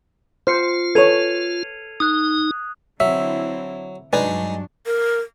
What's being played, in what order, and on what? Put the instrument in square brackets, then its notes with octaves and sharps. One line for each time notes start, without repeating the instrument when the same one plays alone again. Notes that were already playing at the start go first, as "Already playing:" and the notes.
[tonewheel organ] F4 [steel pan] C5 [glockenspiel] F6 C7 C#7
[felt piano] A4 [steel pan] B4 C#5 [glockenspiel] G#6 D#7 F7
[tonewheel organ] D#4 [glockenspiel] D#6 F#6
[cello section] D3 C4 E4 [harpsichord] F#3 [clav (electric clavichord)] E5
[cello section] G2 F#3 D4 [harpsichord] G#3 D#4 [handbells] B4 D5 G#5
[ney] A#4